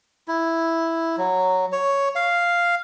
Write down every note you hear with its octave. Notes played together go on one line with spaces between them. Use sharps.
E4
F#3
C#5
F5